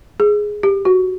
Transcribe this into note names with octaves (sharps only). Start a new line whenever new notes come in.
G#4
G4
F#4